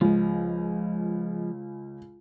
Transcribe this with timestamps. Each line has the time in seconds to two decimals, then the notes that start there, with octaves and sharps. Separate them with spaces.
0.01 C#2 F3 G#3